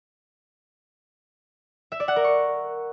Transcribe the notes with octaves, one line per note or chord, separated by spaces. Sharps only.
E5
D5
F#5
A#4
C#6